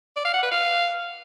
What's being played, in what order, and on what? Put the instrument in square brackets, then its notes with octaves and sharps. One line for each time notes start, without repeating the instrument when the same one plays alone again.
[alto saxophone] D5
F5
F#5
B4
F5